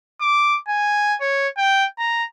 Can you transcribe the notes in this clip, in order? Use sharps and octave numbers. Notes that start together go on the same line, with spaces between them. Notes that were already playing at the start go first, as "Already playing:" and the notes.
D6
G#5
C#5
G5
A#5